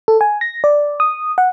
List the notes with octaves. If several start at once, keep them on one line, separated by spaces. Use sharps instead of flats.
A4
G#5
A#6
D5
D#6
F#5